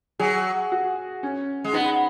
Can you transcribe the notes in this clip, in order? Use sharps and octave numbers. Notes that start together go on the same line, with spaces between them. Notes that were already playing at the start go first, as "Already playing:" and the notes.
F#3 G#4
F#4
C#4
G#3
B3 D#4